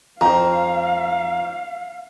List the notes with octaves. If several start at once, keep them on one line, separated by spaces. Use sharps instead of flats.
F2 C5 F5 A#5